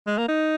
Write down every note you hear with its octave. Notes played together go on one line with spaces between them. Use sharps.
G#3
A#3
D#4